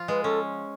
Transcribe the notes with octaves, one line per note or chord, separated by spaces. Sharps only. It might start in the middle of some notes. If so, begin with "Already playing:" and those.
Already playing: F3 F4
G#3 B4
C#4 A4